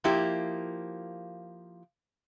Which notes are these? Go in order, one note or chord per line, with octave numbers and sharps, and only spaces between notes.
F3 A#3 E4 G4